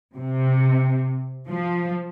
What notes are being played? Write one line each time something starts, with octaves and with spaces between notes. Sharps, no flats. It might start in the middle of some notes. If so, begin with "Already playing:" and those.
C3
F3